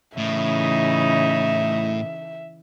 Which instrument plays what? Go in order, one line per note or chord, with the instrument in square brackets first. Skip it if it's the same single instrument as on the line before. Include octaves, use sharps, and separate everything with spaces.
[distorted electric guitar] A2 [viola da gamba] C#3 E3 D#4 [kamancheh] E5